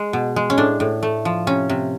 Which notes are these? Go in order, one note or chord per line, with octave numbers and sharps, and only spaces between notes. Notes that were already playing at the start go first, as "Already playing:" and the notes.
Already playing: G#3
B2
G#3
C#4
A2 D4
A2
A3
F3
C3 C#4
C3